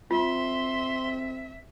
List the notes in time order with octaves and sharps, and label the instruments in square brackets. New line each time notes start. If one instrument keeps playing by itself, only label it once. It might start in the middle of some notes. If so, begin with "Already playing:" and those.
[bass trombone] C4 [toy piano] F4 [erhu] E5 [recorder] C6